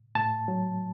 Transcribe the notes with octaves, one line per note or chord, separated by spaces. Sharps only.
A2 A5
F#3